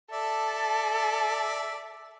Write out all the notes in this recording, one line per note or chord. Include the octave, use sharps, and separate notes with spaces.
A4 D5 E5